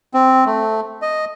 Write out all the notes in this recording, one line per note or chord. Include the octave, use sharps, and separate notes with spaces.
C4
A3
D#5